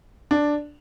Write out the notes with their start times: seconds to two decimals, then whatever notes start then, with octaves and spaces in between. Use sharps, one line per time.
0.31 D4